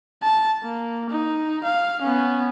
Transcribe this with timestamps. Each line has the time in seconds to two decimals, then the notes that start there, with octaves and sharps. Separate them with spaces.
0.23 A5
0.63 A#3
1.10 D#4
1.64 F5
2.02 B3 C#4